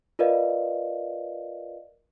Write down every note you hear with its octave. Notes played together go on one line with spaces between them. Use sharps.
F4 A#4 B4 D5 D#5 F5